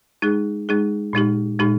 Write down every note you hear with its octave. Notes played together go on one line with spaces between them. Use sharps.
G#3 D#4 G#4
G#3 D#4 G#4
A#2 G#3 D#4 G4
A#2 G#3 D#4 G4